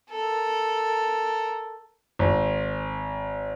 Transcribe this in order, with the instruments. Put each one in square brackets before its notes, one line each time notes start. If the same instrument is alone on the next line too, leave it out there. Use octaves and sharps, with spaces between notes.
[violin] A4 A#4
[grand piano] G#1